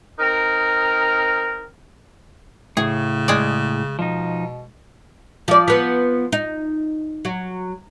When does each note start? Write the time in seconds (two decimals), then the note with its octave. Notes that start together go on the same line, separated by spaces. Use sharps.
0.19 C4 D#4 A#4
2.77 A2 C#3 G#4
3.28 G#3 D5
3.99 B2 F3 D#4
5.48 F3 D5
5.68 F3 B3
6.32 D#4
7.25 F#3